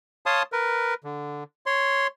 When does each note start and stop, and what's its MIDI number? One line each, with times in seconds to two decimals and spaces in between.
0.26 0.43 73
0.26 0.43 77
0.26 0.43 81
0.26 0.43 84
0.26 0.43 87
0.52 0.94 70
0.52 0.94 71
1.04 1.44 50
1.66 2.07 73
1.66 2.07 84